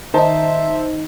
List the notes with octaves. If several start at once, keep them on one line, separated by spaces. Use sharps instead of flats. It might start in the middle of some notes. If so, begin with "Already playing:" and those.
D#3 D#4 C5 E5 A5